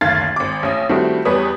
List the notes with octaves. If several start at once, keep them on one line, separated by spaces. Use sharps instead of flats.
F#1 D2 D#3 F5 G#6 A6
G#1 D6
A1 C#4 D#6
D#3 G3 A3 C4 E4 F#4
E2 G3 B4 C#5 D#6